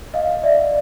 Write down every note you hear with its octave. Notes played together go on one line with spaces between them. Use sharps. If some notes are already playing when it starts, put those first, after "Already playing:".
D#5 F5
D5 E5